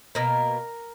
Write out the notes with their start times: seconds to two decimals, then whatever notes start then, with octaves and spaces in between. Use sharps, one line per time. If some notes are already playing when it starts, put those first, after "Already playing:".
0.15 B2 A#3 A#4